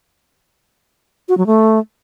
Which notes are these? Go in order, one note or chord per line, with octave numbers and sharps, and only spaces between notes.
F#4
F#3
A3